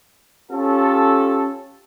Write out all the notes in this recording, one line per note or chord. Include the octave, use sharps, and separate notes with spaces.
C#4 F4 G4 A4